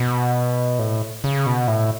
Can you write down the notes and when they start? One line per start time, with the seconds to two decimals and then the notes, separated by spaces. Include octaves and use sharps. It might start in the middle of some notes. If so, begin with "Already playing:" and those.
Already playing: B2
0.79 A2
1.24 C#3
1.46 B2
1.68 A2